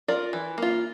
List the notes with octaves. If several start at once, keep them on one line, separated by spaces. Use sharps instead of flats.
F4 A#4 D5
E3
A#3 F4